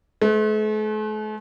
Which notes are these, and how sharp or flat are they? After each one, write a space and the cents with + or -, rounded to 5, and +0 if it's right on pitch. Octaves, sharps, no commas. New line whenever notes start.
A3 -45 B4 +35